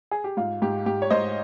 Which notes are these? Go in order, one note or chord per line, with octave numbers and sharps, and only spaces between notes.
G#4
G4
G#2 F4
G#2 G4
G#2 G4
C#5
G#2 C5 D#5